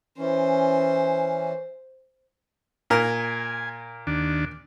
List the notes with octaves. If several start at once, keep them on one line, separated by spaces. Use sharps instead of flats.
E3 C#4 C5
A#2 A#4 G#5
D#2 D4